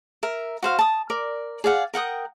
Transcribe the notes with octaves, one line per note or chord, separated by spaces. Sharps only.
A#4 E5
F#4 C5 F5
A5 D#6
A#4 D5
G#4 D5 F5 F#5
A#4 F#5 G5 D#6